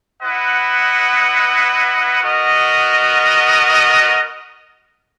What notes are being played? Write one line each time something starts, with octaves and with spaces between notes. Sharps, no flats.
E4 B4 D#5 F#5
B3 F#4 A#4 D#5